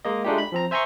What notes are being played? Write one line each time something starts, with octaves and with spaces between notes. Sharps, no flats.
G#3 A#3 D#5
G#3 A3 D4 D#4 F4 G4
B5
F3 C4 A#5
C5 E5 G#5 A#5 C6 C#6